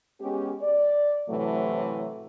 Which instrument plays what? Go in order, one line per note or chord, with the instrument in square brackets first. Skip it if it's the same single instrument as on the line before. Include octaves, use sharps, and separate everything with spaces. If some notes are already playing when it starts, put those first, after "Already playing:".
[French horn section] G#3 B3 C#4 G4
D5
A2 C3 E3 F#3 A3